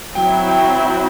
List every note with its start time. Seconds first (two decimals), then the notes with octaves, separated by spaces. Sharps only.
0.15 F#3 C4 E4 G5
0.48 G5